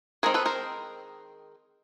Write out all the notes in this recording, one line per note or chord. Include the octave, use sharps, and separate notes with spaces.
D#3 G#3 C4 D#4 G#4 A#4
A4 B4
A#4 C5